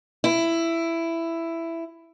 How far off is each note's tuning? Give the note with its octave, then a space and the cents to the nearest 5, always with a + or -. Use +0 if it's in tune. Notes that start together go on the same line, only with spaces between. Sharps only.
E4 +10